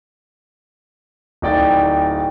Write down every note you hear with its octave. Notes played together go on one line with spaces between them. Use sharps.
D1 D#4 D5 G5 A6